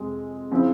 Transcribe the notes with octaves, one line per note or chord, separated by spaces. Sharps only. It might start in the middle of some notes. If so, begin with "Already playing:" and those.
Already playing: F2 C3 G#3 C4
C#3 F3 C4 E4